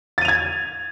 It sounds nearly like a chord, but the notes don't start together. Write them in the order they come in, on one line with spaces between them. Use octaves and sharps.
A6 D#7 F7 G#6